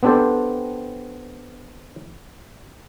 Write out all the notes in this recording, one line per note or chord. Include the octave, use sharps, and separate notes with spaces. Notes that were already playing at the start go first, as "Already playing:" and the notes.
B3 C4 D4 G4 A4 C5